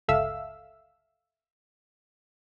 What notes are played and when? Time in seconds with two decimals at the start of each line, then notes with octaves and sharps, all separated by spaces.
0.08 G1 C#2 A4 E5 F5 E6